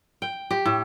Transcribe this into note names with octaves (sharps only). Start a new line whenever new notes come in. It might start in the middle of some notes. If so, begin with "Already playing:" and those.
G5
G4
A2